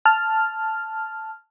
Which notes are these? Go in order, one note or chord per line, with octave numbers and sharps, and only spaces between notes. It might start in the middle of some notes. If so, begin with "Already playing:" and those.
A5 F6